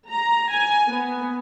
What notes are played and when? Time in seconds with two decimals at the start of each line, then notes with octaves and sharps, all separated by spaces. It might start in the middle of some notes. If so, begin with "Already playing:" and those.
0.10 A#5
0.52 G#5
0.89 B3